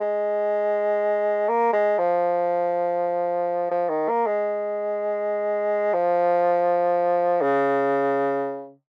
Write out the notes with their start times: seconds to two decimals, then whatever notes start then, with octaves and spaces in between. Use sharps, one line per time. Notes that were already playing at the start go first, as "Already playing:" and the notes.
0.01 G#3
1.49 A#3
1.73 G#3
1.98 F3
3.71 F3
3.89 D#3
4.08 A#3
4.26 G#3
5.93 F3
7.42 C#3